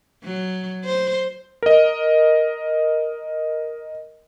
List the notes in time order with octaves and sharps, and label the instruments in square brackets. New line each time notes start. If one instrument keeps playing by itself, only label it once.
[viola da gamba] F#3
C5
[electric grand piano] A#4 D#5